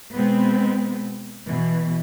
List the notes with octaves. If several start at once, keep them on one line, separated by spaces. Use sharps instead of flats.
B2 G#3 B3 C4
B2 E3